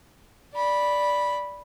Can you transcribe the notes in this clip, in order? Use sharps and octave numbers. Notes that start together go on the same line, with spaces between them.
D5 B5